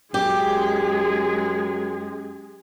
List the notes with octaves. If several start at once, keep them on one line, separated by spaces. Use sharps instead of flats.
F#2 G#3 G4 G#4